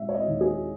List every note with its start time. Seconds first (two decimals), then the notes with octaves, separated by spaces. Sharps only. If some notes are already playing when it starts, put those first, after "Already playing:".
Already playing: G#3 E5
0.09 C#5
0.14 D#5
0.27 D#2
0.41 G#4